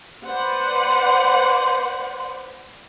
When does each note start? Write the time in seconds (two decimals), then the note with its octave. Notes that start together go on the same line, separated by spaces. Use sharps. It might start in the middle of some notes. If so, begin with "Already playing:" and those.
0.25 B4 C5 D5 F#5